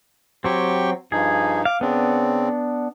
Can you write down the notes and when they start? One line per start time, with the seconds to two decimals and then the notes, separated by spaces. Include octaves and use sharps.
0.44 F#3 C4 G4 G5 C#6
1.12 G2 F3 D#4 G#4
1.65 F5 D6
1.81 C#3 B3 C4 D4